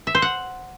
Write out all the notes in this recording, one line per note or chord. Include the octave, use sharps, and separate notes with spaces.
E5
C5
F#5